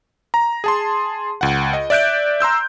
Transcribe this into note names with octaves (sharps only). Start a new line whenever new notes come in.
A#5
G#4 A5 C6
C#2 F#5
D#5
D5 E5 F#6 G6 D7
A#5 C6 E6 G6